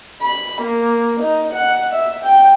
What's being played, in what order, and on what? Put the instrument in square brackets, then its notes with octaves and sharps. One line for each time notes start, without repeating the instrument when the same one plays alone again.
[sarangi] B5
A#3
D#4
F#5
E5
G5